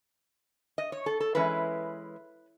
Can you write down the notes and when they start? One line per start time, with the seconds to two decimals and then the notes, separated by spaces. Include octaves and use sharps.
0.78 D#5
0.92 C#5
1.06 A4
1.20 A4
1.35 E3 G#3 C#4 E4 B4